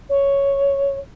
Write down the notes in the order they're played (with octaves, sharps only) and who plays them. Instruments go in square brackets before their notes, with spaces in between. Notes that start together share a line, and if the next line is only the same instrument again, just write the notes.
[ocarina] C#5